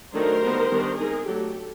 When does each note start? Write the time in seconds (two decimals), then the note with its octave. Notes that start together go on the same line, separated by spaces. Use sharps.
0.14 D#3 F#3 A3 D4 A#4 C5
0.43 D3 G3 B3 D#4
0.71 D#3 G3 B3 D4
0.98 G#3 C4 D#4 G#4 A#4
1.27 F#3 A3 D4 G4 A4